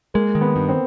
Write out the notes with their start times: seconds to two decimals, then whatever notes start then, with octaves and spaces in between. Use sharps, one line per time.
0.14 G#3 A#3
0.35 D#3
0.41 B3
0.56 G2
0.69 C4